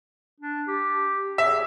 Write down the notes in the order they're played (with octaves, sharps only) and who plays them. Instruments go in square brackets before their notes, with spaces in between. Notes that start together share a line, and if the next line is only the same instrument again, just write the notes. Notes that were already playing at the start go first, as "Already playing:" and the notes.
[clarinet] D4
G4
[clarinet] G#4 [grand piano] E5